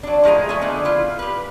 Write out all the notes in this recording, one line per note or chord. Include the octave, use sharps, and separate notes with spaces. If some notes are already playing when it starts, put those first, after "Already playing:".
F#3 D4
A2 F3 G#3 G#4 A#5
A3 E5 G#5
D3 F3 B3 D4
E4 F4
G4 B4